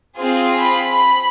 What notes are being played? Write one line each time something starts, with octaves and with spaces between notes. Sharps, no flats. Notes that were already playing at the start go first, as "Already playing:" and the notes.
C4 F4 G#4
B5